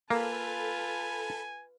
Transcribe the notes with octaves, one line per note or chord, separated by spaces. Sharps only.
A#3 F4 A4 B4 G#5 A5 B5